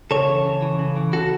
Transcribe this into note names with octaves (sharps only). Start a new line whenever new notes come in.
C#3 A4 C#5
E3
C#3
E3
C#3
E3
C#3 F#4 A4